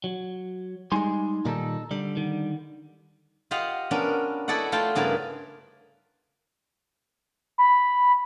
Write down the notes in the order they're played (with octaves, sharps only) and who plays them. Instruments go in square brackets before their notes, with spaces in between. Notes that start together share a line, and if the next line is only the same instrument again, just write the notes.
[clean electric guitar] F#3
[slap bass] G3 G#3 [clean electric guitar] D#4 G#5 C6
[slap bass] A#2 D#3 G3 [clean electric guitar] D#4 A4
[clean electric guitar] D3 [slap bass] G3
[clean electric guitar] D3 D#3
[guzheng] F4 G4 D#5 F5 F#5
B3 C#4 D4 A#4
E4 F#4 A4 D5 D#5 F#5
A3 F4 G5 A5 C6
G2 C#3 B3 E4 A#4 A5
[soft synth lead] B5